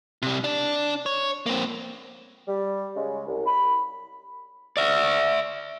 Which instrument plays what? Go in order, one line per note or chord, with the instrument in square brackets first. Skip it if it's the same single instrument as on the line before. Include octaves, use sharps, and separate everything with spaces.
[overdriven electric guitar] C3 G3
D4 D5
C#5
A#3 C4
[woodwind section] G3
C#3 G#3
C2
B5
[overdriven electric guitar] D5 E5